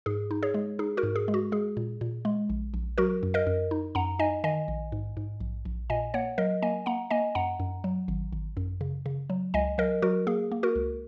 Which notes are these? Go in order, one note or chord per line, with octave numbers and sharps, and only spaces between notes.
G#2 G#4
D#4
G#4 C#5
G#3
D#4 G#4
F#4 A#4
G#2
G#4
G#3
F#4
G#3 G#4
A#2
A#2
G#3
A#1
A#1
F#3 F#4 A#4
F#2
A#4 D#5
F#2
D#4
F#2 F#5 A#5
D#4 D#5 G#5
D#3 D#5 G#5
A#1
G#2
G#2
A#1
A#1
A#2 D#5 G#5
A#3 C#5 F#5
F#3 A#4 D#5
A#3 D#5 G#5
A#3 F#5 A#5
A#3 D#5 G#5
F#2 F#5 A#5
F#2
F#3
G#1
G#1
F#2
C#3
C#3
F#3
C#2 D#5 G#5
F#3 A#4 D#5
F#3 F#4 A#4
A#3 G#4
A#3
F#4 A#4
C#2